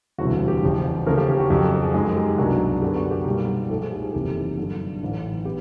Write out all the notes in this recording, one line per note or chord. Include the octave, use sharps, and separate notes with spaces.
E1 D2 C3 E3 G3 F#4
F#4
G4
F1 E2 C#3 F3
D#2 C#3 F3 A3 C#4 A#4
G4
G4
F#4
F2 C#3 F#3 G4
A4
G#4
F#2 D#3 G#3 G#4
G#4
G4
C2 B2 F#3 A#3 D4 F#4
F#2 D3 F#3 B3 D4 G4
F#4
G4
B1 A#2 G3
G#2 F3 A3 A4
G#4
G4
G#4
F#1 E2 C3 D#3 G4
G2 D3 F#3
A1 G#2 E3
B3 G4